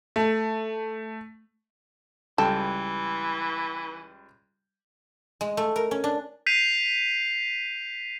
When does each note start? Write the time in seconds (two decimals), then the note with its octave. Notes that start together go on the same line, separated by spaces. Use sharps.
0.16 A3
2.38 C#2 E3 G3 A4 G5
5.41 G#3
5.57 A3
5.76 A#4
5.91 C#4
6.04 D4
6.46 G6 B6 C7 D#7 F7